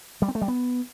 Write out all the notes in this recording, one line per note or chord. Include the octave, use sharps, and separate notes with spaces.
G3
C4
A3
G3
B3